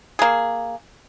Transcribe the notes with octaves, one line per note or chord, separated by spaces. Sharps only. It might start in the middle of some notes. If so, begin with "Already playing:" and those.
A#3 G#4